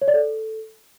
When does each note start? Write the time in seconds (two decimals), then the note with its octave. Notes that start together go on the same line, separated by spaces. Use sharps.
0.02 C#5
0.08 D5
0.14 A4